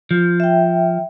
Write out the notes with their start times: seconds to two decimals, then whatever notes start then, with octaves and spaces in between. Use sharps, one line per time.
0.11 F3
0.40 E5 G5